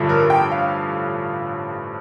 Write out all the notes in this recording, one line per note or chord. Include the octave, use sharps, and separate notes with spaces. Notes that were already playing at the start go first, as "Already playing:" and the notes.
Already playing: A1 G2 D3 F3
A#4
G5
F5